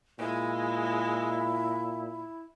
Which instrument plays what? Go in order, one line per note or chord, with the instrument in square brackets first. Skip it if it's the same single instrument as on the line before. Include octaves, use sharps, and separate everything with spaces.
[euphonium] A#2 [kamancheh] G#3 [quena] E4